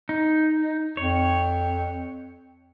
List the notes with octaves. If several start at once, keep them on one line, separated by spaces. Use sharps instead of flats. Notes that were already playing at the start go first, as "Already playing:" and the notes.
D#4
F2 C#5